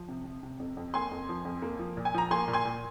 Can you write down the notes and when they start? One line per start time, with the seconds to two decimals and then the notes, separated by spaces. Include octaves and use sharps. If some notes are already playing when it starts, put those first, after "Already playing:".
Already playing: F3
0.08 C3
0.25 C3
0.43 C3
0.60 F2
0.77 F2
0.94 A#3 G#5 C6
1.11 F2
1.29 F3
1.45 F2
1.62 A#3
1.79 F3
1.97 A#2
2.05 G#5
2.14 F3 A#5
2.31 A#3 G#5 C6
2.48 A#2
2.53 G#5 C6
2.65 A#2